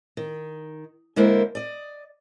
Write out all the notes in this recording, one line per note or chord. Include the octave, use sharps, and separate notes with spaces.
D#3
D3 G#3 A#3 E4 A#4 C5
D5 D#5